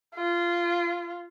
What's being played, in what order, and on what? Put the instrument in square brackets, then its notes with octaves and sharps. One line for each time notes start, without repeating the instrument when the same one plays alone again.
[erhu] F4